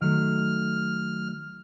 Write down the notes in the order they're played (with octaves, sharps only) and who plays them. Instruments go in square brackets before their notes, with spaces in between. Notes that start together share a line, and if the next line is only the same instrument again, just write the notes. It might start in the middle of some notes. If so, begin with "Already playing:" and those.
[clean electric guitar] D#3 F#3 A3 [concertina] F6